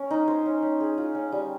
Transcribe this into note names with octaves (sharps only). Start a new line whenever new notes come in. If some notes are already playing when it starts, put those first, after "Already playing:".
Already playing: C#4 A#4
D#4
C5
C#4
C#4
G#4
F4
C#4
G3